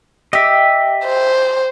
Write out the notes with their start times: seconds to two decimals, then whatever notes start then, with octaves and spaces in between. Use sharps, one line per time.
0.33 G4 D#5 E5
1.06 C5